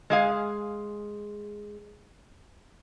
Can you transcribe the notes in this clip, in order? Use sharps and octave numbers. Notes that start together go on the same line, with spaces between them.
G#3 G#4 F5